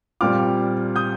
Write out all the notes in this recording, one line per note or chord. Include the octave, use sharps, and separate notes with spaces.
A#2 G3 C4 F4 D6 F6
D#6 G6